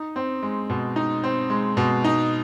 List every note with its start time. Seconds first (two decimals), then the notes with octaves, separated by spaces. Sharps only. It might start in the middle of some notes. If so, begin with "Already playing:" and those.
Already playing: D#4
0.16 C4
0.43 G#3
0.70 B2
0.96 D#4
1.24 C4
1.50 G#3
1.77 B2
2.04 D#4